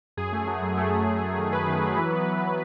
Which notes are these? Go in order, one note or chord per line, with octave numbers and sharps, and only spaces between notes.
F#2 G#4
A3
F#3
F#2
A3
A3
F#2
A3
D#3
F#3 B4
D#3
F#3
E3
B3
E3